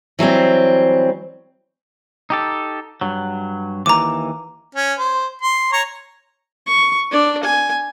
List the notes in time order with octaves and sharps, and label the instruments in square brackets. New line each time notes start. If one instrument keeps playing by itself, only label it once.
[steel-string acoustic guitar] E3 F#3 G3 C4
[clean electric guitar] D#4 G4 A4
G2 F#3
[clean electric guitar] D#2 E3 [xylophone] A#5 D6
[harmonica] C#4
C5
C6
C#5 A#5 C#6
[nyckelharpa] C#6
D4 D5
G#5